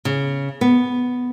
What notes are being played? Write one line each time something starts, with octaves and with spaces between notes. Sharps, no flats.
C#3
B3